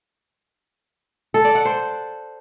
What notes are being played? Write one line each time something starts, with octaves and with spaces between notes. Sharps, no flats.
A4
D5
F#5
C5